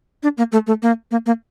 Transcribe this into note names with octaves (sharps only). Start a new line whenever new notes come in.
D4
A#3
A3
A3
A#3
A#3
A#3